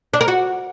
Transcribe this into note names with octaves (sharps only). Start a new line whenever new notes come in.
D4
A#4
F#4